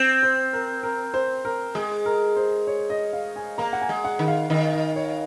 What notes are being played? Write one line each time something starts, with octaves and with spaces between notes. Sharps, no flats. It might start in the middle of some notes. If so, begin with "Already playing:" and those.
Already playing: C4
C5
A#4
A#4
C5
A#4
G#3 G#4
A#4
C5
C#5
D#5
F5
G#5
A#3 A#5
F#5
G#5
G#3
F#5
D#3
F5
D#3 D#5
D#5
C#5